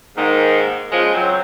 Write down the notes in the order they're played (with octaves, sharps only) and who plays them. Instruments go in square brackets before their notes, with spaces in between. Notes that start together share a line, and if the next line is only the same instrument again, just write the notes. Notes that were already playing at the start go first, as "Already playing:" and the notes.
[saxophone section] G#2 D#3 G#3 A#3
C#3 F3 G#3
F#3 C4